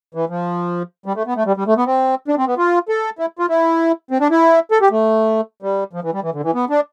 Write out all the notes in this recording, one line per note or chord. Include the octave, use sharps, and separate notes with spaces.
E3
F3
G3
A3
B3
A3
G3
G3
A3
B3
C4
D4
C4
B3
F4
A4
E4
F4
E4
C4
D4
E4
A4
G4
A3
G3
F3
E3
G3
E3
D3
E3
B3
D4